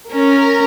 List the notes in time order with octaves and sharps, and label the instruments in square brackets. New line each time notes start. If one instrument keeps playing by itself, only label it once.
[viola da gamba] C#4 [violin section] A#4